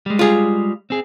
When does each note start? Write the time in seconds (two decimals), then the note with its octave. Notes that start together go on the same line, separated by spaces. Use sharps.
0.06 G3 G#3
0.19 F4 G#4
0.90 C4 G#4